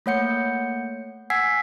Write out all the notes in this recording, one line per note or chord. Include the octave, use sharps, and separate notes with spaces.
A3 A#3 C#5 F#5 G6 C#7
F#5 G#5 E6 G#6 B6 C7